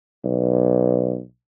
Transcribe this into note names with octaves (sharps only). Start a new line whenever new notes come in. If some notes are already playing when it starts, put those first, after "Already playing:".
B1